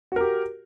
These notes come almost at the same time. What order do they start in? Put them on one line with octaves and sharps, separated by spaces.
F#4 A#4 G4